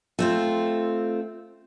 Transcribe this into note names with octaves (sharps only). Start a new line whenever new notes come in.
A3 C4 F4